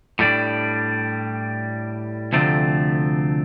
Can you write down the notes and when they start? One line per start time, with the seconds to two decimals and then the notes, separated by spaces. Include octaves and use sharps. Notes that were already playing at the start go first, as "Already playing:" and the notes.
0.19 A2 G3 D4
2.33 D2 C3 F3 A3 C4